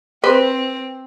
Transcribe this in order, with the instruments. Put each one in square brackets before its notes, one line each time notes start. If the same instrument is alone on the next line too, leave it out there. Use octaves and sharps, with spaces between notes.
[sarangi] C4 [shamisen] B4 C5